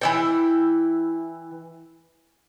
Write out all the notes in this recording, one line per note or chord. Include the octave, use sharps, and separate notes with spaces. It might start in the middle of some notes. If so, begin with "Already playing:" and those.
E3 E4 G5